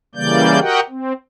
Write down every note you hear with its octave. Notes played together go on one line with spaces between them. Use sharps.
C#3 E3 G3 A#3 D5 G6
F#4 G4 A#4 D#5 F#5 G5
C4